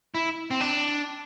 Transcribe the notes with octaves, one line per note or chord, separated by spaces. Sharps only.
E4
C4
D4